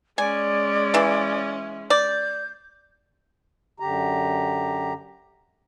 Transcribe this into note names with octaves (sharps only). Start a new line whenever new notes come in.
G#3 C#4 D5 G#5
C#3 E3
D5 G6
F#2 D3 G4 A#5